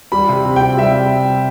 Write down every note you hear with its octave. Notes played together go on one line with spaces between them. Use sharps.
G3 B5
C3
C3
C4 G5
G3 E5